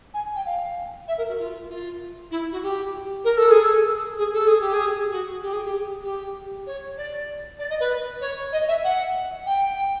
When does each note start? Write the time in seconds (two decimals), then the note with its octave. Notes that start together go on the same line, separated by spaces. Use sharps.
0.14 G#5
0.35 G5
0.45 F5
1.08 E5
1.18 A#4
1.28 F#4
1.38 F4
1.69 F4
2.31 E4
2.52 F#4
2.62 G4
3.24 A#4
3.37 A4
3.50 G#4
3.64 A4
4.18 G#4
4.33 A4
4.47 G#4
4.60 G4
4.73 G#4
5.11 F#4
5.42 G4
5.53 G#4
5.64 G4
6.03 G4
6.66 C#5
6.97 D5
7.59 D5
7.69 D#5
7.80 B4
8.21 C#5
8.52 D#5
8.68 E5
8.84 F#5
9.46 G5